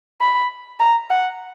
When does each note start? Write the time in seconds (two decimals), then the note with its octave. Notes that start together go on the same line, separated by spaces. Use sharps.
0.21 B5
0.80 A#5
1.10 F#5